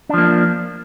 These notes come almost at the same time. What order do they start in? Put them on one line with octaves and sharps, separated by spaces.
D4 F3 A#3